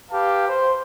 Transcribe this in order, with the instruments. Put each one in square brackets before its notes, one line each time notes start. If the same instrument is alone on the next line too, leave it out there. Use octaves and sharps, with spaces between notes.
[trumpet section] G4 B4 F5 A5
C5